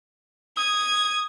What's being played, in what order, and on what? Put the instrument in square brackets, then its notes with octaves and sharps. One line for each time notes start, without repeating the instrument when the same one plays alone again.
[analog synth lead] D#6 [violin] G#6